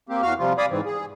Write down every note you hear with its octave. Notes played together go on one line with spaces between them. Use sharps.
A#3 C4 G4
E2 F#4 F5 F6
C3 F3 G3 F4
D5 F5 G#5 B5 D#6
G#2 E3 C4
G#4